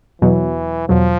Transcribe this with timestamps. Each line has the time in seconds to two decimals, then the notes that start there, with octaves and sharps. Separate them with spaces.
0.22 E2 B2 E3 F#3
0.89 E2 B2 F3 F#3